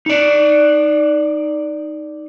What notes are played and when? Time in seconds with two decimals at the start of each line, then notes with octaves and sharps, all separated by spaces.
0.06 D#4 D5